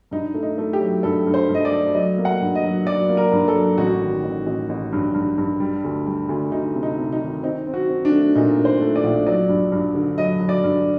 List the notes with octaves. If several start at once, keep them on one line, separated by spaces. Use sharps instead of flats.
G2 D#4
A3
D#4
A3
G4
F#3
G2 A4
G2
C5
G2
D#5
D5
A3
F#3 D#5
A#3
F#5
G2
D#5
F#3
F#3 D5
A#3
A#4
G2
A4
F#3
A1 F#4
D#3
A1
A1
A1
G2
G2
G2
G3
D2
G3
D2
D2 D#4
C3
D#4
C3
D#4
D#3
C4 D#4
C4
F#4
C4
D4
A3
A#2 D#4
A#2
C5
A3
D5
A#1
F#3 D5
G2
G2
D3
F#3 D#5
F#3
D5
G2